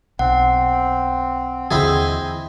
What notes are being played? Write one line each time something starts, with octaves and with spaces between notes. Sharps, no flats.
B1 C4 F#5
D#2 D3 E3 C4 E4 G#4 D#5